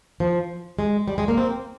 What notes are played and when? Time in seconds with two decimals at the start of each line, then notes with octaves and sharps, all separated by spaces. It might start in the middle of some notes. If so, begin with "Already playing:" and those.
0.20 F3
0.79 G#3
1.08 G3
1.18 G#3
1.28 A#3
1.38 C4